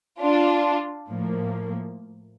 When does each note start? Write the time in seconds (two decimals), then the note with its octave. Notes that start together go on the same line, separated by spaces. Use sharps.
0.21 D4 F4
1.10 A2 F3 A#3